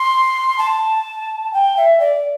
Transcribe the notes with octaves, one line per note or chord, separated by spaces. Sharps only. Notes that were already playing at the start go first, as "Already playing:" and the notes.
Already playing: C6
A5
G5
E5
D5